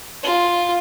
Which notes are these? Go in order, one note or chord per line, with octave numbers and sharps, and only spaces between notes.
F4